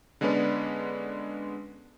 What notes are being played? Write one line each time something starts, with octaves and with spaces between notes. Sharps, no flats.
D3 G#3 B3 C#4 B4 D5